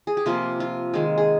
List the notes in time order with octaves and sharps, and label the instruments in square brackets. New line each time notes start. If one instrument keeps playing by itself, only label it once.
[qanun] G#4
G4
C3 F3 A#3 F4
F4
D#3 G#3
G#4